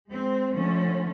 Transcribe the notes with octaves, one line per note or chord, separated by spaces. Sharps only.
G#3 C4
D3 F3 A3 C#4